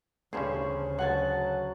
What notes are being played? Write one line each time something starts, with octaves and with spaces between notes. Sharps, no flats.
A1 D2 G2 C#3 C#4 G#4 C5 C#5
C#2 F#3 F#5 G#5 A5